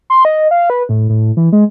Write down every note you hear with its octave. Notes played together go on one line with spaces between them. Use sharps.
C6
D#5
F5
B4
A2
A2
E3
G#3